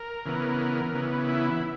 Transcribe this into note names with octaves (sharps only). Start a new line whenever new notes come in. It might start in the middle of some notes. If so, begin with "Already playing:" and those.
Already playing: A#4
C#3 E3 B3
C#3 E3 B3
E4
E4